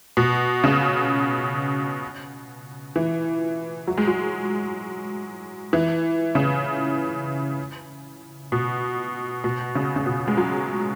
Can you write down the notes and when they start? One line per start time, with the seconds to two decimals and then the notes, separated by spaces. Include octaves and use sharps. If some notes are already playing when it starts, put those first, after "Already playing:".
0.17 B2
0.64 C#3
2.96 E3
3.87 F#3
3.98 G#3
4.07 F#3
5.73 E3
6.35 C#3
8.52 B2
9.44 B2
9.75 C#3
9.96 C#3
10.06 B2
10.28 G#3
10.37 F#3